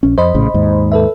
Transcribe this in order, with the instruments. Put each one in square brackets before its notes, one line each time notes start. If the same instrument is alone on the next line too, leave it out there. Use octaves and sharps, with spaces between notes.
[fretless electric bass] A#1 C#4
[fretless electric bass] F2 [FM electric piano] C5 D#5 B5
[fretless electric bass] A#1 A2 C#3
D#2 G#2
[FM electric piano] A4 B4 E5